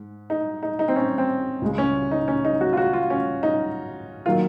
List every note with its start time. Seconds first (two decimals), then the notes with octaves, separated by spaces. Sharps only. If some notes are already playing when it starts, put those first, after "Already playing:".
Already playing: G#2
0.30 D#4
0.63 D#4
0.79 D#4
0.88 C4
0.96 C#4
1.18 C4
1.62 C#2 C#3 G#3
1.78 C#4
2.11 D#4
2.28 C#4
2.45 D#4
2.61 F#4
2.73 F4
2.77 F#4
2.93 F4
3.10 C#4
3.43 D#4
4.26 D#3 F#3 A#3 F4